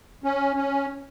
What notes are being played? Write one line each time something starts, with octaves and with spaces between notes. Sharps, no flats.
C#4
C#4